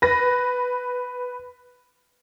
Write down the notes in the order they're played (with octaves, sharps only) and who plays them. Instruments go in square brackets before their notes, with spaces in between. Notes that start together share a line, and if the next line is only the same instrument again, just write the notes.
[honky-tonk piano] B4 A#6